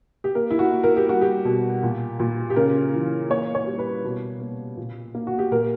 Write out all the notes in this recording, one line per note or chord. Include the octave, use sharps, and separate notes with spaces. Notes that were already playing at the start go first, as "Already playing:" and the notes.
G4
A#3 A#4
E4
F#4
A#3
A#4
G4
G3 F#4
G4
B2
A#2
A#2
G4
C#3 A#4
E3
A#3 C#5
C#5
G3
B4
B2
A#3
A#2
A#3
F#4
G4
A#2 A#4